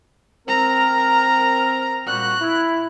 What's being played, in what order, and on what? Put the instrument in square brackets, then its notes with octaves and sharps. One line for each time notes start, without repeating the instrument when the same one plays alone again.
[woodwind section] C4 A#4 [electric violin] A#5
[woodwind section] A#2 G3 F#4 [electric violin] F#6
[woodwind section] E4